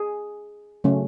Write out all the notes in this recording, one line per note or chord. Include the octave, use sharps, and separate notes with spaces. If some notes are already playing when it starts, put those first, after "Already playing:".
Already playing: G#4
C#3 F#3 A3 C#4